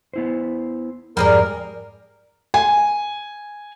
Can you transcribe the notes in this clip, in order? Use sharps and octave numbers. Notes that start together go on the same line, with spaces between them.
B3 E4 C5
F2 G#2 G3 G#4 A#4 D5
G#5